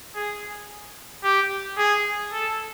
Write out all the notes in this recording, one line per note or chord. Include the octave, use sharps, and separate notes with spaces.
G#4
G4
G#4
A4